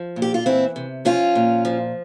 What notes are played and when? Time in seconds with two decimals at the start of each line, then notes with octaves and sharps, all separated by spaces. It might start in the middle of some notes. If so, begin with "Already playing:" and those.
Already playing: F3
0.16 A#2
0.22 G4
0.34 F4
0.46 E3 C4 E4
0.76 C3
1.05 F3 C#4 F4
1.35 A#2
1.65 F3